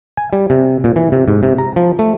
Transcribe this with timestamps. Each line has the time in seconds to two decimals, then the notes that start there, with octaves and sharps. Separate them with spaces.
0.17 G#5
0.33 G3
0.50 C3
0.84 A#2
0.96 E3
1.12 C3
1.28 G#2
1.43 C3
1.58 A#5
1.76 F3
1.99 A3